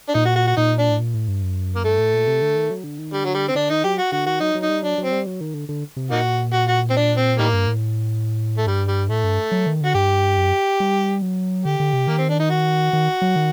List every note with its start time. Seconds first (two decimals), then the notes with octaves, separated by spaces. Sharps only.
0.09 D4
0.14 A#2 D#4
0.25 F#4
0.35 F#4
0.47 F#4
0.56 A#2 D#4
0.79 D4
0.90 A2
0.99 A#2
1.14 A2
1.28 G2
1.42 F#2
1.76 A#3
1.84 G2 A3
1.99 A2
2.14 A#2
2.27 C3
2.42 D3
2.56 D#3
2.70 F#3
2.84 D3
2.99 D#3
3.12 D3 G3
3.25 F#3
3.34 G3
3.48 C4
3.55 D3 D4
3.70 D#3 D#4
3.84 F#3 G4
3.99 F#4
4.12 D3 F#4
4.26 D#3 F#4
4.40 F#3 D#4
4.55 F#3
4.63 D#4
4.69 G3
4.83 F#3 D4
4.98 F#3
5.04 C4
5.12 G3
5.27 F#3
5.41 D#3
5.54 D3
5.69 D3
5.97 C3
6.11 A#2 A#3 D#4 F#4
6.53 F#4
6.68 F#4
6.90 C4
6.97 D4
7.17 C4
7.39 A2 D#3 G3 A#3
7.53 G2
7.67 A2
8.57 A3
8.67 G2 G3
8.88 G3
9.09 A2 A3
9.24 G2
9.52 F#3
9.67 D#3
9.81 D3 F#4
9.95 G2 G4
10.38 F#2
10.80 G3
11.22 F#3
11.65 D3 G4
11.80 D3
11.93 C3
12.07 D#3 A#3
12.18 C4
12.29 D4
12.39 D#4
12.50 F#4
12.93 D#3
13.22 F#3
13.36 D#3